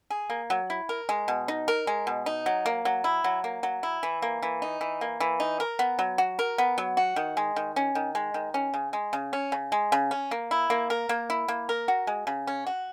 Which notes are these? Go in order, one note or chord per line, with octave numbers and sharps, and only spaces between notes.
G#4
A#3
F#3
E4
A#4
G#3
B2
D#4
A#4
G#3
B2
D#4
F#3
A#3
F#3
E4
F#3
A#3
F#3
E4
E3
A#3
E3
D#4
E3
A#3
E3
D#4
A#4
B3
F#3
F#4
A#4
B3
F#3
F#4
D#3
G#3
D#3
C#4
D#3
G#3
D#3
C#4
C#3
G#3
C#3
C#4
C#3
G#3
C#3
C#4
A#3
E4
A#3
A#4
A#3
E4
A#3
A#4
F#4
G#3
C#3
C#4
F#4